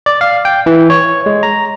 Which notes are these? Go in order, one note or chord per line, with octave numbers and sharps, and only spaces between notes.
D5
F5
G5
E3
C#5
G#3
A#5